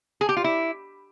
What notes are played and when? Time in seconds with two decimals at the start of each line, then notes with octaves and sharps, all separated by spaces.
0.21 G#4
0.29 G4
0.37 F4
0.44 E4